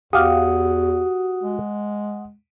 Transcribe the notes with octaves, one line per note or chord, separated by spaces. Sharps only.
E2 F#4 G4 F5 F#5 D#6
G#3